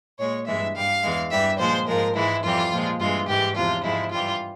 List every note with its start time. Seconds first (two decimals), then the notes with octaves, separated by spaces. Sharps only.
0.19 A#2 G#3 C#5
0.47 G2 E3 G#3 E5
0.76 G2 G3 F5
1.04 E2 E3 G#3
1.31 G2 E3 G3 E5
1.59 A#2 F3 G#3 C5
1.87 G#2 F3 G#3 A#4
2.16 G#2 E3 G#3 E4
2.44 F2 E3 G3 F4
2.72 A#2 F3 G#3
3.00 G2 E3 G#3 F4
3.28 G#2 E3 G#3 G4
3.56 E2 C3 F3 F4
3.84 G#2 F3 G#3 E4
4.11 G2 E3 G3 F4